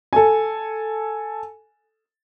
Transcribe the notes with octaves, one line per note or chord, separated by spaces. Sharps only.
A4 G#5